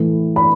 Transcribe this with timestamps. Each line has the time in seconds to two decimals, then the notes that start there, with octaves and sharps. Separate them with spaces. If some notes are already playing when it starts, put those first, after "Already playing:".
Already playing: A2 E3 A3
0.36 B5